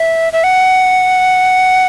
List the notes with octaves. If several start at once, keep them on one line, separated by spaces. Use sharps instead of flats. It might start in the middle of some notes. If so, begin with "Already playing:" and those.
Already playing: E5
E5
F#5